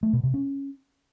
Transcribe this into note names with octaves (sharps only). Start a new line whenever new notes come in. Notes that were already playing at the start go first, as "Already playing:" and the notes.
A3
B2
C3
C#4